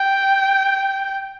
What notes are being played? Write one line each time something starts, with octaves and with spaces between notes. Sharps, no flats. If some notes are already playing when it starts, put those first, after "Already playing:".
Already playing: G5